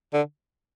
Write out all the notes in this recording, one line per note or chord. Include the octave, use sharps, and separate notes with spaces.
D3